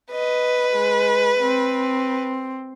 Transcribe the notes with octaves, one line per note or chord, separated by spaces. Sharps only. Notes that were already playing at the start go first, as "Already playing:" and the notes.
B4 D#5
G#3
C4